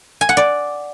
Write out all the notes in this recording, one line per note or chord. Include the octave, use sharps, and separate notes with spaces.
G#5
F#5
D5